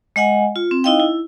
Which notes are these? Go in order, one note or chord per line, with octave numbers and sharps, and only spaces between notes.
G#3 D#5 F#5 G#5
F4
C4
D#4 E4 D#5 F5 G5
E4